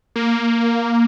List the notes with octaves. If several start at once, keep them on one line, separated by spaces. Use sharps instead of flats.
A#3